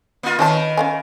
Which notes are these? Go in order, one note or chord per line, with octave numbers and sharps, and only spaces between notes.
A#3 F4
D#3 C4 C#4 B4 A5
C#4 F5 G#5